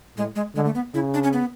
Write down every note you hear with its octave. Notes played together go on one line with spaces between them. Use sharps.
A2 G#3
G#3
D3 G#3
A3
B3
C#3 E4
D4
C#4
B3